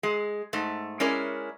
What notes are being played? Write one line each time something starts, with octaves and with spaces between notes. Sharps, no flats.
G#3
G#2 A3
G#3 C#4 E4 A#4 D5